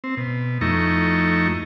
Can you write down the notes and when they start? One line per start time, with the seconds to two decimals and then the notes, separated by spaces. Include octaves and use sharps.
0.04 C4
0.17 B2
0.61 F2 A3 D#4 E4 A#5 C#6